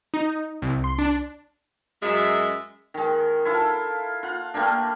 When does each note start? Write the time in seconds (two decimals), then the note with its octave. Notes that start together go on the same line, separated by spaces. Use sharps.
0.14 D#4
0.62 C2
0.84 C6
0.98 D4
2.02 F#2 G#3 E5
2.94 D#3 G#3
3.45 E4 F4 A4
4.23 F4 F#5
4.54 G3 A3 A#3 D4